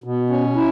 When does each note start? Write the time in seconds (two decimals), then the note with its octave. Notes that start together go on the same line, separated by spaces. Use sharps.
0.04 B2
0.30 C#4
0.56 E4